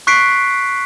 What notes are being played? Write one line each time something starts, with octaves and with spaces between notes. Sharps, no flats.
C#6 F#6 B6 C7 D7